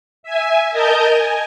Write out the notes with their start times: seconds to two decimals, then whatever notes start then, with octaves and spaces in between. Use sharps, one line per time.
0.23 E5 G#5
0.71 A#4 D#5 A5 G6
1.13 G#5